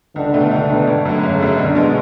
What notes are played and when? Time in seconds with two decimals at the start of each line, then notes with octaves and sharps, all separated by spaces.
0.16 C#2 D3
0.34 B2 A3
0.51 C#2 D3
0.69 B2 A3
0.87 G#1
1.05 F#2 D3 A3
1.23 G#1 C#3
1.40 F#2 D3 A3
1.58 B1 D3
1.75 B2 G#3